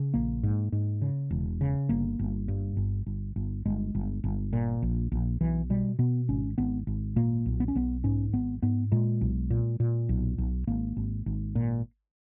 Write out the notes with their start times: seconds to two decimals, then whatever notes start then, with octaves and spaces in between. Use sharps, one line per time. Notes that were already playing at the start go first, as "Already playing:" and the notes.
Already playing: C#3
0.14 A#1 A#3
0.43 G#2
0.72 G#2
1.02 C#3
1.31 E1
1.61 C#3
1.89 G1 A#3
2.19 G1
2.48 G2
2.77 G1
3.06 G1
3.36 G1
3.65 G1 G#3
3.95 G1
4.24 G1
4.53 A#2
4.82 A#1
5.12 A#1
5.41 B1 E3
5.70 B2 G3
5.99 B2 B3
6.29 G#1 C#4
6.58 G#1 B3
6.87 G#1
7.16 A#2 A#3
7.46 B1
7.60 B3
7.68 C#4
7.75 B1 B3
8.04 G#2 C#4
8.33 G#1 B3
8.62 G#2 B3
8.92 A#2 G#3
9.21 B1
9.50 A#2
9.80 A#2
10.09 B1
10.38 B1
10.67 G#1 A#3
10.97 G#1
11.26 G#1
11.55 A#2